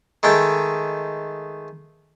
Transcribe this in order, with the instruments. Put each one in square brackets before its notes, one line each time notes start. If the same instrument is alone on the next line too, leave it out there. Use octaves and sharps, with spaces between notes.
[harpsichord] D#3 G#3 A3 G5